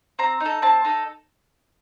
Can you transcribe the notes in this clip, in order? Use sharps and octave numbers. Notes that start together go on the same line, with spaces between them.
C4 A#5
D#4
A4
C4 A5
D#4 A4